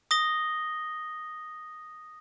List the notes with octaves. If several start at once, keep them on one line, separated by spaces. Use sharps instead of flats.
D#6 A#6 G7